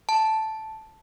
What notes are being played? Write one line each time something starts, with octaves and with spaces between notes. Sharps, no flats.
A5